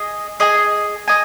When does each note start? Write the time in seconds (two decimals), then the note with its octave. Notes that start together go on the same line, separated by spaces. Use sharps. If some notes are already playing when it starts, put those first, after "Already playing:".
Already playing: G#4 D#5 G#5
0.40 G#4 D#5 G#5
1.08 D#5 G#5